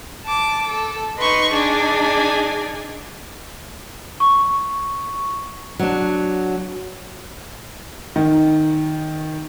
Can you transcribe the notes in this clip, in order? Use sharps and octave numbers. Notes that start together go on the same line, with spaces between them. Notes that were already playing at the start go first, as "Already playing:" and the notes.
A5 D6
A4
D#4 B4 C6 C#6
D4 D#4 G#4 G#5
C#6
F#3 D4
D#3